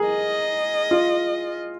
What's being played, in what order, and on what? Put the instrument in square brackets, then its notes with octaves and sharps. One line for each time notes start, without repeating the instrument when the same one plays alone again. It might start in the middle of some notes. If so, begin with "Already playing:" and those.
Already playing: [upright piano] G#4 A#4
[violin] D#5
[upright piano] F4